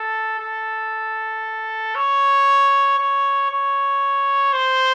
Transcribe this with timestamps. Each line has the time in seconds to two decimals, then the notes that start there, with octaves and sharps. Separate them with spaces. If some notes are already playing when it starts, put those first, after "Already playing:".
Already playing: A4
0.39 A4
1.95 C#5
2.98 C#5
3.50 C#5
4.53 C5